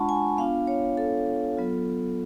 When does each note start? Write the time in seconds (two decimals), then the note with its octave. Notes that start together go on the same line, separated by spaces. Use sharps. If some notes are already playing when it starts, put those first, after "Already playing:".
Already playing: G#3 D4 F4 F#5 A5 B5 C#6
0.09 G#5
0.38 B3 D4 F4 F5
0.67 C#5
0.97 A4
1.57 F#3 B3 F4